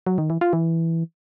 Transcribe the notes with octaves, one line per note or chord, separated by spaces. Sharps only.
F#3
D#3
E3
F4
E3